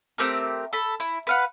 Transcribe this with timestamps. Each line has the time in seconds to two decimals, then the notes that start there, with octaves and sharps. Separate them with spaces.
0.18 A3 C4 G4 A#4
0.73 A4 B5
1.00 E4
1.27 B4 F5 F#5